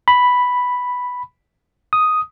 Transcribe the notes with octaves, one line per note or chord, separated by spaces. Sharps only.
B5
D#6